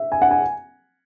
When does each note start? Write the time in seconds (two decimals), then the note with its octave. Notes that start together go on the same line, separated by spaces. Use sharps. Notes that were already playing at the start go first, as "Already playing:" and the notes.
Already playing: E5
0.12 G#5
0.22 F#5
0.31 G#5